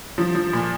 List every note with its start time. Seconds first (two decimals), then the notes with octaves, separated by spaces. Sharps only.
0.18 F3
0.35 F3
0.53 A#2